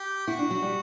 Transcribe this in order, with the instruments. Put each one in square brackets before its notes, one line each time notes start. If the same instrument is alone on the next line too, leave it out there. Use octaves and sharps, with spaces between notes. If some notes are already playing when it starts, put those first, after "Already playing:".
Already playing: [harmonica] G4
[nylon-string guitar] E4 [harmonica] F#4
[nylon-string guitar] D4
F#3
G3